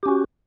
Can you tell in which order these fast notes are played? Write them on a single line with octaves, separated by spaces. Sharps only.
G4 C#4 F#4